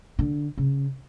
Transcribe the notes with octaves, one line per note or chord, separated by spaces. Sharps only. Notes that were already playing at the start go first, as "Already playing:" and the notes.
D3
C#3